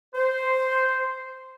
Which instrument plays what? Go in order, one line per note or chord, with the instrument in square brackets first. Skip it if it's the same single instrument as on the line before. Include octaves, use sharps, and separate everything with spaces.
[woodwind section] C5